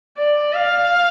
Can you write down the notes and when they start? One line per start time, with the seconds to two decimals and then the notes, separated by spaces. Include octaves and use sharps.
0.18 D5
0.53 F5